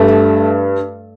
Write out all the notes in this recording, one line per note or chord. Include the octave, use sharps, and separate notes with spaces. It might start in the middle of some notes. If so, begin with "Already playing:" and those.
Already playing: G2 A3